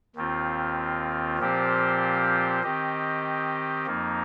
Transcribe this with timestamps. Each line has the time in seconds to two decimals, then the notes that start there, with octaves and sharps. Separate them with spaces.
0.15 D#2 D#3 C4 F4
1.39 A#2 F3 C4 G4 C5
2.63 D#3 C4 G4 D#5
3.86 F2 F3 A#3 D#4